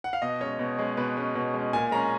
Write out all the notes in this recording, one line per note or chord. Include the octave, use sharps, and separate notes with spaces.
F#5
F5
B2 D#5
G#3 C#4 C#5
B2
G#3 C#4
B2 B4
G#3 C#4
B2
G#3 C#4
A#2 G#5
G#3 C#4 A#5